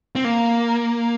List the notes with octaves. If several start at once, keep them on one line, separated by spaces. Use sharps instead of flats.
C4
A#3